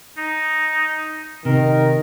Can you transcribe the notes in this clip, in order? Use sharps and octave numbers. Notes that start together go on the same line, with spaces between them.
D#4
C3 D#3 A#4